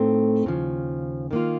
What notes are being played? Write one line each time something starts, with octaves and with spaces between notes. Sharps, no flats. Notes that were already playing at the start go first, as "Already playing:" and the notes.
Already playing: A2 A3 C4 D#4
D#2 C#3 F3
D#3 A#3 F4